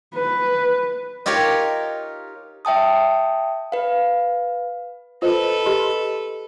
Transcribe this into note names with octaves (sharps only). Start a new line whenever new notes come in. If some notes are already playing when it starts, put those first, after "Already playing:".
B4
D#4 F4 G4 A#4 C#5
E5 G5 A5 D#6
B4 F5
F4 A4 B4 C5 D#5
G4 D#5 C6